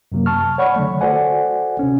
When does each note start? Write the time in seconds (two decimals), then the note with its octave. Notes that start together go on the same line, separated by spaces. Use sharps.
0.12 F#2 C3 F#3 A#3
0.26 A5 C#6 F6
0.58 C#5 D5 F#5 B5 C#6
0.76 D3 F#3 A3
1.01 F#4 A4 C5 D5 F#5 G#5
1.79 C3 C#4